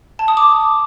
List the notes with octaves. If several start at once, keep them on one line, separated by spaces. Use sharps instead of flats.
A5
D#6
D6